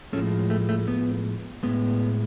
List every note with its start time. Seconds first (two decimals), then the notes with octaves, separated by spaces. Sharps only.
0.13 A2 F3 G#3 A3 C#4
0.50 A3
0.69 A3
0.88 B3
1.63 A2 G#3 B3